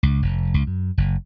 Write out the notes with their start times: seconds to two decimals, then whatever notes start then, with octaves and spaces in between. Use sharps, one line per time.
0.03 C#2
0.22 F1
0.54 C#2
0.67 F#2
0.98 F#1